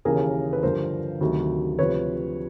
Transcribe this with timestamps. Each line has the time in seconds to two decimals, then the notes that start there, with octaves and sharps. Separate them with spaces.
0.05 D#2 C#3 E3 G#4 A#4
0.53 B4
0.63 G2 D3 F3 A#4 C5
1.21 D2 C3 D#3 F#3
1.79 D2 C3 F3 B4 C#5